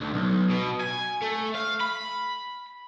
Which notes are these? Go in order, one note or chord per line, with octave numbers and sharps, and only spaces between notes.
D2
B1
B2
G#5
A3
F5
B5